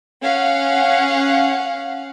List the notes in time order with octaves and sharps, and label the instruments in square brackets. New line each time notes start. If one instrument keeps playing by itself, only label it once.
[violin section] C#4 F5 F#5